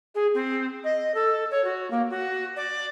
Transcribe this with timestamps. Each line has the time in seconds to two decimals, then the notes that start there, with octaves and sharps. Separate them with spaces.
0.14 G#4
0.34 C4
0.83 D#5
1.14 A4
1.50 C#5
1.64 F#4
1.90 A#3
2.09 F#4
2.56 D5